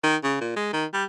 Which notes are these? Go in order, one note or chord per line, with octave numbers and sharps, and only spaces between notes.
D#3
C#3
A#2
G#3
D#3
G3